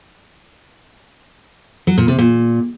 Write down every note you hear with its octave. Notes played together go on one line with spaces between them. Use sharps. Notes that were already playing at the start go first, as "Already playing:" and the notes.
F#3
A#2
C3
A#2